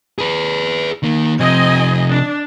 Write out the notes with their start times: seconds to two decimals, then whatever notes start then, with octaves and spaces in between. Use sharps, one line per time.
0.18 G#4 B4
1.03 D#3 A#3
1.40 C3 F3 C4 D#5 G#5
2.09 D4